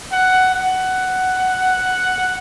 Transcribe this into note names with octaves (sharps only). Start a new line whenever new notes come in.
F#5
F#5